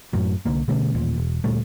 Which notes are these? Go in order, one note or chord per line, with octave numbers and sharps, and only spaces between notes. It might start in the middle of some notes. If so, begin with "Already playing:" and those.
F#2 A2 F#3
C2 D3 A#3
B2 D3 A3 C#4
A1 D#2 A#2
E1
D2 A#2 G3 A3